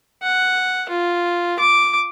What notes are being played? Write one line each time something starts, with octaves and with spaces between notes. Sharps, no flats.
F#5
F4
D6